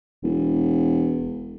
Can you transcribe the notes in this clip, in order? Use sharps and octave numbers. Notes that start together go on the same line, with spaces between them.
E1